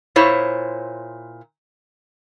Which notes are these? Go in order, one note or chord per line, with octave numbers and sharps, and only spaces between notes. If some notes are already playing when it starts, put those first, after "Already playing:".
A#2 E4 C5 C#5